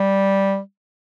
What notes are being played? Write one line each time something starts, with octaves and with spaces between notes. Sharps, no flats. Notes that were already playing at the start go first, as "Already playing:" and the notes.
Already playing: G3